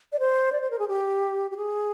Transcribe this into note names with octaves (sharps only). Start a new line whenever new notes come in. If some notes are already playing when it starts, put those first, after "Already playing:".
D5
C5
D5
C5
A#4
G#4
G4
G4
G#4